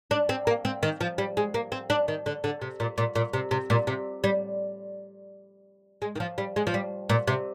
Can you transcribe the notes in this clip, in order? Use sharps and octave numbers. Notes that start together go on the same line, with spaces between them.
D4
C4
A#3
C4
D#3
F3
G3
G#3
A#3
C4
D4
D#3
D3
D3
C3
A#2
A#2
A#2
C3
C3
A#2
C3
G3
G#3
D#3
F3
G3
G#3
F3
G3
A#2
C3